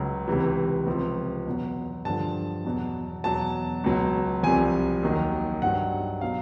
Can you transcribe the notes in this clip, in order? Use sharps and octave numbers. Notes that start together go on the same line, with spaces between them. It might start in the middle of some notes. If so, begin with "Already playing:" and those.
Already playing: C#2 C#3 F#3
C#2 C3 E3
C#2 C3 F3
E2 B2 F#3
G2 D3 F3 A5
E2 B2 F#3
E2 B2 F#3 A5
C#2 B2 F#3
C2 C3 F3 G#5
D#2 D#3 F#3
G2 D#3 F#3 F#5
B2 F#3 F5